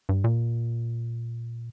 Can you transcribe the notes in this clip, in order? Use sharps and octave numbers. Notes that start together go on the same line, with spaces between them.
G2
A#2